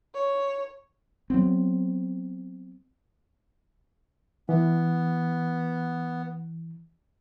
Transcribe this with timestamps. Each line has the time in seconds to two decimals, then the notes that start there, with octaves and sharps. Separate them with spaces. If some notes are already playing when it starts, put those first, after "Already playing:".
0.15 C#5
1.30 F#3 B3 C4
4.49 E3 B3